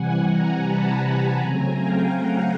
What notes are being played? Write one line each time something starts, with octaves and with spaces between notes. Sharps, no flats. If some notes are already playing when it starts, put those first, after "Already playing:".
Already playing: C3 E3 G3 F#5 G#5
G#5 A#5
A5 B5
C#3 F#3 A3 C4 G#5 A#5
F5 G5
F#5 G#5